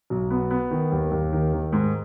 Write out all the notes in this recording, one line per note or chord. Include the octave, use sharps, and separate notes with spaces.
B1
B3
B3
D#3
D#2
D#2
D#3
D#3
G#2